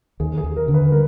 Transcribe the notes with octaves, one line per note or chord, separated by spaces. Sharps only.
D#2 G#4
G#4
D#2
A#4
D3
B4
G3 A#4